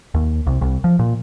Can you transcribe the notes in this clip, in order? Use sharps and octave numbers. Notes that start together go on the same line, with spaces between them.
D#2
C2
C2
F3
A#2